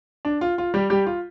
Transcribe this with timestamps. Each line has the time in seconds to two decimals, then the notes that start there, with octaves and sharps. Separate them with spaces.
0.25 D4
0.41 F4
0.58 F4
0.74 G3 G4
0.90 G3 G4
1.06 F4